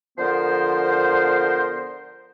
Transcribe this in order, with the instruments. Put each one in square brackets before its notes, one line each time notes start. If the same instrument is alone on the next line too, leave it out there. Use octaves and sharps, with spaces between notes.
[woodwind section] D3 F3 B3 A#4 C5